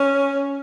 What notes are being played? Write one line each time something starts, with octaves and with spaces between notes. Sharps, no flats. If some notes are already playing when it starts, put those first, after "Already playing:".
Already playing: C#4